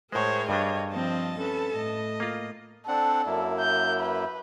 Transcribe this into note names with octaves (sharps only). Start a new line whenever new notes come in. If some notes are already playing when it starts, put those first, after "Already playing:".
A2 G#3 G#4 A#4 C5 C#5
G2 G3 D4 C#5 D#5
F3 C4 D#5 A5
C#4 A4 B4
A2 D#5
A#3 F4
C4 D4 A4 F#5
F#2 A#3 E4
G6
B4